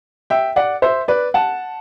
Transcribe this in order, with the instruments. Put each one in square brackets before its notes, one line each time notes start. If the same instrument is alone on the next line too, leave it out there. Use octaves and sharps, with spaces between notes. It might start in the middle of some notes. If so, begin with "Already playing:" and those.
[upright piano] E5 G5
D5 F#5
C5 E5
B4 D5
F#5 A5